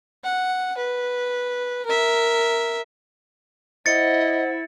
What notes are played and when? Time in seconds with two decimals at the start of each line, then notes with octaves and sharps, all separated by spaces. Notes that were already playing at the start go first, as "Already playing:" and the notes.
0.24 F#5
0.78 B4
1.86 A#4 E5
3.86 E4 C5 D#5 F#5 A6 C#7